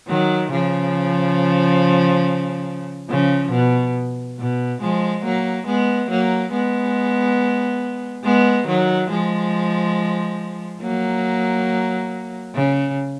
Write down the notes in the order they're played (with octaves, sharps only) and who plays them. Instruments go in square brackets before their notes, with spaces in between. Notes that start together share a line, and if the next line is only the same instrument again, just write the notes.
[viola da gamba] D#3 F#3
C#3 F3
C#3 F3
B2
B2
F3 G#3
F#3 A#3
G#3 B3
F#3 A#3
G#3 B3
G#3 B3
D#3 F#3
F3 G#3
F#3 A#3
C#3